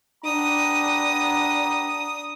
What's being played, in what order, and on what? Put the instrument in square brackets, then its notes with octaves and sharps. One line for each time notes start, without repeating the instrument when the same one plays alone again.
[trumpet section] B3 G4 A#5 [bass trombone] D4 [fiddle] D#6